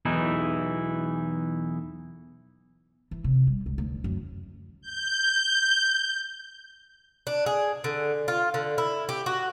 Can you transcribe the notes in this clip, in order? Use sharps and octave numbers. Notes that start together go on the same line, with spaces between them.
B1 E2 E3 D#4 E4
E3
C3
G3
C#2
D2
F#2
G6
D4
G#4
D3
F4
D3
E4
G4
F#4